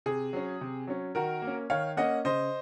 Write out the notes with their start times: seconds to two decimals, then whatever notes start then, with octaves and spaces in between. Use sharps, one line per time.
0.06 C3 G#4
0.33 F#3 C#4
0.61 C3
0.87 F#3 C#4
1.15 D#3 F#4 A#4
1.42 A#3
1.47 C#4
1.70 D#3 C#5 F5
1.97 A#3 C#4 D#5 F#5
2.25 C#3 C5 D#5